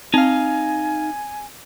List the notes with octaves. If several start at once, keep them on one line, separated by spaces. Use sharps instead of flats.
C4 D#4 F5 G#5